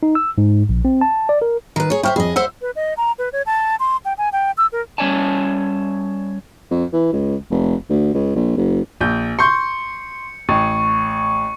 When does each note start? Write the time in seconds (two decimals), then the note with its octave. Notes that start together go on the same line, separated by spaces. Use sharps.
0.03 D#4
0.15 E6
0.38 G#2
0.69 A#1
0.85 C4
1.01 A5
1.29 D5
1.42 A#4
1.76 D#3 B4 A#5
1.90 G#4 C#5
2.03 E4 C5 E5 G5 C#6 F6
2.16 F2 G#4 D#5
2.36 C5 E5 F#5 E6
2.62 B4
2.76 D#5
2.97 A#5
3.19 B4
3.33 C#5
3.46 A5
3.80 C6
4.05 G5
4.18 G#5
4.33 G5
4.58 E6
4.72 A#4
4.98 G3 C#4 C#5 D5 G#5 A5
6.71 F2
6.93 E3
7.12 C#2
7.50 F1
7.90 D2
8.14 C#2
8.36 A#1
8.57 F#1
9.01 A#1 G6
9.39 C6 C#6 G6 C#7
10.49 A1 C#6